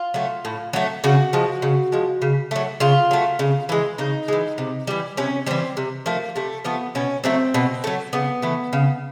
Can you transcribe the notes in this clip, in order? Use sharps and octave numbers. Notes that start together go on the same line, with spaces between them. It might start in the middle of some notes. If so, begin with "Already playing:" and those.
Already playing: F4
F#3 A3
A2
F#3 A3
C#3 F#4
F3 G#3
C#3
F3 G#3
C#3
F#3 A3
C#3 F4
F#3 A3
C#3
E3 G#3
C#3 D#4
E3 G#3
C3
E3 G3
C3 C#4
E3 G3 C4
C3
F3 A3 A#3
C3 A3
F3 A3 B3
B2 C#4
F#3 A3 C4
B2
F#3 A3
C#3 B3
E3 A3
C#3